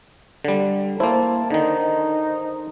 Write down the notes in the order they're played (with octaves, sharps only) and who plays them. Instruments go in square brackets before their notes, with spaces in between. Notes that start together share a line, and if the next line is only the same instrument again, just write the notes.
[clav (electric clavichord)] D3 G3
[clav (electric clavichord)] A#3 E4 [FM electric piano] C5 [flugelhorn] A5
[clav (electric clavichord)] D3 D#3 [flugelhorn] D#4